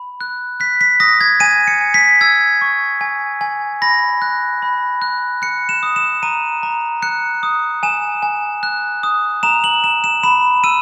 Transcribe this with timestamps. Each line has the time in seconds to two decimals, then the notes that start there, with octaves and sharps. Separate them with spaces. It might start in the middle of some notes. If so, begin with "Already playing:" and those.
Already playing: B5
0.21 F#6
0.60 F#6 B6
0.81 B6
1.00 D#6 A#6
1.21 G#6
1.40 G#5 D#7
1.68 C#7
1.81 G#5
1.94 B6
2.21 E6 G#6
2.61 C#6
3.01 G#5
3.41 G#5
3.82 B5 A#6
4.22 F#6
4.62 B5
5.02 F#6
5.42 F#6 C#7
5.69 E7
5.83 D#6
5.96 E7
6.23 A#5 D#7
6.63 A#5
7.02 F#6 C#7
7.43 D#6
7.83 G#5 E7
8.23 G#5
8.63 F#6
9.03 D#6
9.43 A#5 E7
9.64 F#7
9.84 A#5 E7
10.04 E7
10.23 B5 E7
10.64 E6 D#7